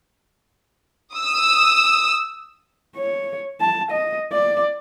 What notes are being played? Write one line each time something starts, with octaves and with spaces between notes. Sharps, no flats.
D#6 E6
C#5
A5
D#5
D5